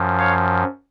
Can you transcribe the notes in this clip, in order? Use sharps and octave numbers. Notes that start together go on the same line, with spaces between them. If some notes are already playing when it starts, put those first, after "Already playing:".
Already playing: F#2 F3
C#5 F5